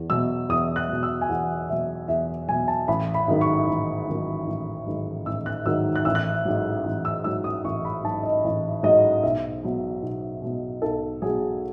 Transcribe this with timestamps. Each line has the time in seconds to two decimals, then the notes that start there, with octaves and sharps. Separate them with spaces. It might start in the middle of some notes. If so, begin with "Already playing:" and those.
Already playing: E2
0.10 B2 F#3 E6
0.49 E2 D#6
0.76 F#6
0.89 B2 F#3
1.03 E6
1.21 G#5
1.29 E2 F#5
1.68 B2 F#3 E5
2.08 E2 E5
2.48 B2 F#3 G#5
2.68 A5
2.88 A1 B5
3.14 B5
3.28 G#2 D#3 F#3
3.41 C#6
3.67 A1
4.07 G#2 D#3 F#3
4.47 A1
4.86 G#2 D#3 F#3
5.26 A1 E6
5.46 F#6
5.66 G#2 D#3 F#3 E6
5.95 F#6
6.05 A1 E6
6.15 F#6
6.45 G#2 F#3
6.86 A1
7.05 E6
7.24 G#2 F#3 E6
7.44 D#6
7.64 A1 C#6
7.85 B5
8.04 G#2 F#3 A5
8.23 D#5
8.44 A1
8.83 G#2 F#3 D#5
9.23 B1 E5
9.63 B2 F#3
10.03 B1
10.42 B2 F#3
10.82 B1 A4
11.22 B2 F#3 G#4